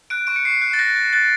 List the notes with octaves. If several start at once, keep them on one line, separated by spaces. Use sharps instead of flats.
F#6 D7
C#6 D7
C#7
C#6 C7
F#6
A6
F#6 A#6
F#6
F#6 A6